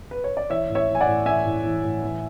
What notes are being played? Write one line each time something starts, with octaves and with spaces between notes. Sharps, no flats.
B4
C#5
D5
E3 C#5 E5
A2
C#5 E5
E3
G#5
D5 F#5
A2
E3 E5 G#5
A2
E3
A2
E3